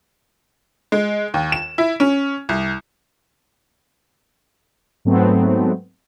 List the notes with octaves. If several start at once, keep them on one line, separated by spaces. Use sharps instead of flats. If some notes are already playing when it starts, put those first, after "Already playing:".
G#3
D#2
E7
E4
C#4
C2
G#2 F#3 A3 B3 C4